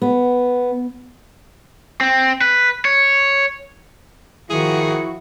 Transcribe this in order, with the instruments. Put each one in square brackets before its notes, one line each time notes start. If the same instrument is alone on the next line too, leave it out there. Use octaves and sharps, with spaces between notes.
[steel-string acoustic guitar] B3
[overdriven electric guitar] C4
B4
C#5
[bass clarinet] D#3 [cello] F3 F#4 [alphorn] E4 [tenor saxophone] G#4